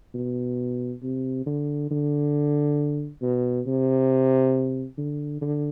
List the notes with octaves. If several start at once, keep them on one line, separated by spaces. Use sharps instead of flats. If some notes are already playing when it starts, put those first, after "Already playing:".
B2
C3
D3
D3
B2
C3
D3
D3